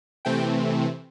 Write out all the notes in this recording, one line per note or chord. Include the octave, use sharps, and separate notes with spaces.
C3 E3 A3 C4 G5